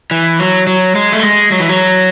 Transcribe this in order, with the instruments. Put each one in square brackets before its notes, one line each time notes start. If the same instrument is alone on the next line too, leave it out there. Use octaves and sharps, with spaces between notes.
[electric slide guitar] E3
F#3
F#3
G#3
A3
G#3
F#3
E3
F#3